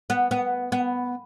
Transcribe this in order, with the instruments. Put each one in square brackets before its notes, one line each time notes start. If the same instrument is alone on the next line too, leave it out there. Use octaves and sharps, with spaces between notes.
[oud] B3
B3
B3